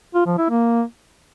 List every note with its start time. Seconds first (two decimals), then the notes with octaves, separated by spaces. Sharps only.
0.15 F4
0.26 F3
0.38 E4
0.49 A#3